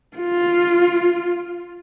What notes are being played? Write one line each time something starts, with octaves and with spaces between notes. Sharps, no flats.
F4